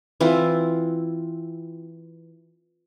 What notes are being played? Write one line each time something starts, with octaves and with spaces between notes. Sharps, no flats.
E3 C4 E4 F4